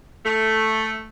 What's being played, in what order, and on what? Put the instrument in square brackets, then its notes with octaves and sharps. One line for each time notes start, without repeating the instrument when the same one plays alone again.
[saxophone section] A3